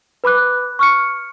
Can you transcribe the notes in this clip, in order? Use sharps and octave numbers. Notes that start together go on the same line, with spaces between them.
B4 B5 D6 F#6
C#6 F6 C#7